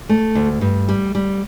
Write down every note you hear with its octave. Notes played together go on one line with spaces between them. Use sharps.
A3
D2
G2
G3
G3